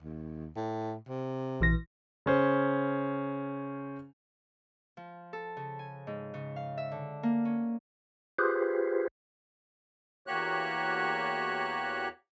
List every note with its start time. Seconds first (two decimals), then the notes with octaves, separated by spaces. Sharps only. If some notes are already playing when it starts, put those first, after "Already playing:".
0.02 D#2
0.56 A2
1.09 C3
1.61 A#1 E3 A#6
2.26 C#3 C#4 C5
4.97 F3
5.33 A4
5.57 C#3
5.79 G#5
6.07 G#2
6.34 C#3
6.56 F5
6.78 E5
6.92 D3
7.23 A#3
7.45 C#4
8.38 F4 G4 G#4 B4 C5
10.27 E2 A#3 F#4 G4 C#5 F#6